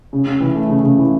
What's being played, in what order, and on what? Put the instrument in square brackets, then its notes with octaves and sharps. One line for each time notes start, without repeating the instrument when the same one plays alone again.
[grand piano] C#3
C#3
E3
A3
C#3
C#3
E3